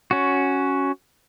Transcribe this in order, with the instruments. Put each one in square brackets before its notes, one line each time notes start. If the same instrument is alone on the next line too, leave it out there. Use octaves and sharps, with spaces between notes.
[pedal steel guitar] C#4 F#4